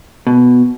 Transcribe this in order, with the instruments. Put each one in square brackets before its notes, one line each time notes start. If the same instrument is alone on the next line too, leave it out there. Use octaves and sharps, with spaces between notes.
[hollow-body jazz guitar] B2